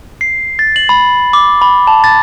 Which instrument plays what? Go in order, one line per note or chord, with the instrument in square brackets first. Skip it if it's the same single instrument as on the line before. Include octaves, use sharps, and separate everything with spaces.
[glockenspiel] C7
A6
F#7
B5
D6
B5
A5
A6